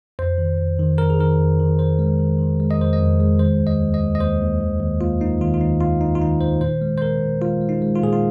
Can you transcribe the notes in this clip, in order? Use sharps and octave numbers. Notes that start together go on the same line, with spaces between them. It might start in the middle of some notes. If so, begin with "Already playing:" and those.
F2 C5
D#3
F2
D#3
F2 A#4
G#4
D#3 A#4
F2
D#3
D#3 C5
G#3
D#3
D#3
G#3
D#5
F2 C5
D#5
F2
G#3
D#3 C5
D#2
D#5
D#2
D#5
D#2
D#5
D#2 C5
D#2
D#2
D#2
A#3 F4
A#3 D#4
D#3 F4
F4
D#2 D#4
D#2 F4
D#2 D#4
F4
D#3 D#4
D#3 C5
A#2 C5
G#3
C5
A#2 A#4
A#2
G#3 F4
G#3
D#4
G#3
F4
A#2 G#4
F4